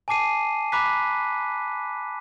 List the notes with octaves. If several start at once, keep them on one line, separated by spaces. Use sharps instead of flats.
G#5 A5 D6 C7 D#7
A#5 B5 D6 F#6 B6